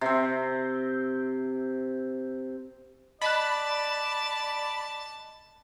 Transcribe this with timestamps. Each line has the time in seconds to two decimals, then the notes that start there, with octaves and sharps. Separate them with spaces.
0.01 C3 C4
3.22 D5 D#5 A5 B5 F#6